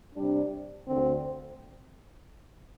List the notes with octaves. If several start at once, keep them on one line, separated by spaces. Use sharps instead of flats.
C3 G3 D4
D2 D3 C4